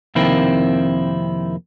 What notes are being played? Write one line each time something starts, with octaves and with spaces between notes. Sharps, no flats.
F2 C3 D#3 A#3 C4 E4